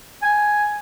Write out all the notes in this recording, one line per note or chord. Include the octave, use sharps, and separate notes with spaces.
G#5